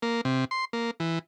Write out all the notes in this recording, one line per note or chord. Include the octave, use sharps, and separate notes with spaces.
A#3
C3
C6
A#3
E3